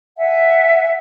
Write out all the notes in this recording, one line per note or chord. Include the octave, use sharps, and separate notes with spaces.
E5 F#5 G#5